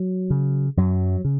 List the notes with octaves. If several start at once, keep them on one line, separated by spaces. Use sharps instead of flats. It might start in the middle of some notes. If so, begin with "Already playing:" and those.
Already playing: F#3
C#3
F#2 F#3
C#3